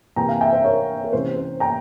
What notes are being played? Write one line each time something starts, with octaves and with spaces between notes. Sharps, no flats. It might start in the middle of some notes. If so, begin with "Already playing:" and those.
C3 E3 A#3 G5 A#5
F5 G#5
E5 G5
C5 E5
A#4 C#5
A#4
C3 E3 A#3 C#4 C5
C5
G5 A#5